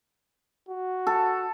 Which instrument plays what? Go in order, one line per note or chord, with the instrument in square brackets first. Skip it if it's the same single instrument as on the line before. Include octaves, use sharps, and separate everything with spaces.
[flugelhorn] F#4
[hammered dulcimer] A4